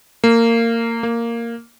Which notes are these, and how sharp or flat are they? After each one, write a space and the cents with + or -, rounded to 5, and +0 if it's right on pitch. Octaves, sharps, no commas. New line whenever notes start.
A#3 -20
A#3 -5